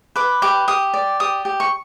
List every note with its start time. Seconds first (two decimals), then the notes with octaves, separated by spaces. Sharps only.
0.16 B4 D6
0.42 G4 D6
0.68 G4 D#6
0.94 D5
1.20 G4 D#6
1.45 G4
1.60 C#6